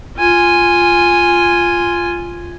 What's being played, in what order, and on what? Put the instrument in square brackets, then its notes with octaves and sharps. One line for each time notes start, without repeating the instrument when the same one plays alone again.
[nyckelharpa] F4 G#5